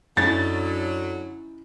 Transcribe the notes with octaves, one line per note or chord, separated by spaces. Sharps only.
F#2 D3 F#3 C#4 D#4 E4 A6